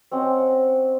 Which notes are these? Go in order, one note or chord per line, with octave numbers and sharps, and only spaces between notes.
C4 C#4 D#5 F#5